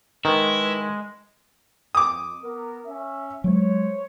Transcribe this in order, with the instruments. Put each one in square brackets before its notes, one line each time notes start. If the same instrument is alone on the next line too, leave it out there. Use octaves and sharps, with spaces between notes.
[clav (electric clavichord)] D#3 [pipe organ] G#3 [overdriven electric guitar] E4 [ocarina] B4
[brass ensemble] F2 [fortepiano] D6 D#6
[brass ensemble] B3 A#4
C#4 E5
[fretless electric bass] F#3 G#3 [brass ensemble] C5 C#5